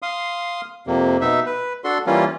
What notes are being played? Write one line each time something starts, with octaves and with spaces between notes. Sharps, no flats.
F5 C6 D#6
F2 C3 A#3
B2 D#4 E5
B4
D4 F#4 A4 C6
E3 G3 A#3 C#4 F4